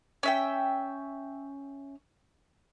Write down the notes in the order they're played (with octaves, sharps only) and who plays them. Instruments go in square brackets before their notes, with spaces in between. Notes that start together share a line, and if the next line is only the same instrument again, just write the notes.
[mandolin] C#4 E5 G5